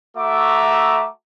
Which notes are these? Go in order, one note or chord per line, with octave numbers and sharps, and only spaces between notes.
A3 F#4 E5 A#5 D6